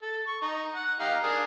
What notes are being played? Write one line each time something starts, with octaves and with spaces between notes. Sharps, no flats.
A4
C#6
D#4
F#5
D#4 G4 F5
D4 G#4 A#4